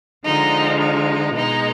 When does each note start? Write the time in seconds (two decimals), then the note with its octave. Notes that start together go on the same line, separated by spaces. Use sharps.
0.24 D3 F3 G#3 D#4
0.80 D#4
1.36 B2 G#3 D#4